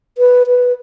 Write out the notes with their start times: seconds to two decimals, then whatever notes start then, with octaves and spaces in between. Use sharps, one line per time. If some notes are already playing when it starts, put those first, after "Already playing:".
0.18 B4
0.47 B4